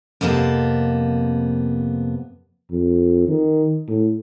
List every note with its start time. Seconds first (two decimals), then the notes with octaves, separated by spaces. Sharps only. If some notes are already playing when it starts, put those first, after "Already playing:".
0.21 F2 C3 A#3 B3 G#4 A5
2.72 F2
3.28 D#3
3.88 A2